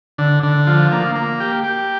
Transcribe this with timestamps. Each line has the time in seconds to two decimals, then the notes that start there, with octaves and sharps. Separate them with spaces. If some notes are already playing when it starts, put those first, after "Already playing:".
0.18 D3
0.43 D3
0.67 F3
0.92 A#3
1.15 A#3
1.40 G4
1.64 G4